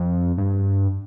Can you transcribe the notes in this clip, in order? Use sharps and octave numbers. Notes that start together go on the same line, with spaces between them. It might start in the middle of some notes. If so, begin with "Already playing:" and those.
Already playing: F2
G2